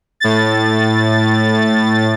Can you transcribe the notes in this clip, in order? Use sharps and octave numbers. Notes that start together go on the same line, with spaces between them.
A2 A6